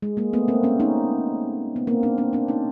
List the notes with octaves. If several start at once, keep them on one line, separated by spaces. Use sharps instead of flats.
G#3
G#3 A#3
A3 B3
A#3 C4
B3 C#4
C#4 D#4
B3
A#3 C4
C4 D4
C4 D4
C4 D4
C#4 D#4